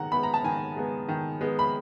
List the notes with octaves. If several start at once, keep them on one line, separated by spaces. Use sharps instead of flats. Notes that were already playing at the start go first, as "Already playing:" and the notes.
Already playing: D#3 G#3 B3 F#5 A#5
G#3 B3 B5
A#5
A5
D#3 G#5
G#3 B3
D#3
G#3 B3
B5